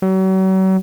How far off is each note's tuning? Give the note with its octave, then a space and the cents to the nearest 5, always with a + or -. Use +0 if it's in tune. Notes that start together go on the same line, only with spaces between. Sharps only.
F#3 +40